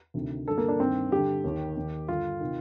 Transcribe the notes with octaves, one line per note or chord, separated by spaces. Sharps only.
D2 C3 D#3
G2 D3 A4
A#3
D4
G2 D#3 C4
G2 D3 G4
D#2 D#3
D#2 D#3
G2 D3 F4
C3 D#3